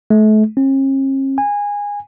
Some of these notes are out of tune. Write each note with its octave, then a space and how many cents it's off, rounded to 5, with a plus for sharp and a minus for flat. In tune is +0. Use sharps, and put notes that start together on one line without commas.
A3 -35
C#4 -45
G#5 -20